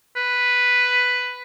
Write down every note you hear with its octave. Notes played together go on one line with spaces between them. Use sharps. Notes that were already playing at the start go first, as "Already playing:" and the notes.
B4